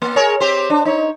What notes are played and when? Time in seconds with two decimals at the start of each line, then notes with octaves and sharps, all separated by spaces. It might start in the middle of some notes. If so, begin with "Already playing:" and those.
0.02 A#3
0.16 G#4 A#4 C#5
0.40 C4 G4 C5
0.70 D4
0.85 D#4 C#5